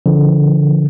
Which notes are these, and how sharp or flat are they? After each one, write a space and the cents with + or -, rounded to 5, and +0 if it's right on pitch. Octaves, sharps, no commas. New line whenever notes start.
D3 -20 F3 -35